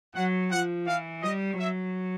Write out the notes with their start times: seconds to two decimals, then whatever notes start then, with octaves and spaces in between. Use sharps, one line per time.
0.15 F#3 F#5
0.51 F3 F#5
0.87 E3 F5
1.23 G3 D#5
1.58 F#3 E5